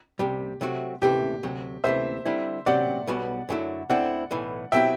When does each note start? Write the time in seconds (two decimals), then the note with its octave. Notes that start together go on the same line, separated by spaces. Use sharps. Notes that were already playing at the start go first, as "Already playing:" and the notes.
0.19 C2 C3 G3 G4
0.61 C3 F#3 A3 C4 F#4
1.02 D2 C3 E3 A3 G4
1.43 D2 C3 F#3
1.84 D2 C3 E3 A3 C5 E5
2.25 D3 G3 C4 E4
2.66 C3 F#3 C4 G4 D5 F#5
3.07 B1 B2 G3 B3 F#4
3.49 F#2 D3 F#3 A3 E4
3.90 D2 D3 A3 C4 E4 D5 F#5
4.31 B1 A2 E3
4.72 B2 F#3 C4 E4 G4 E5 G5